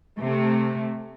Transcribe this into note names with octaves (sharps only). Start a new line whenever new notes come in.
C3 A3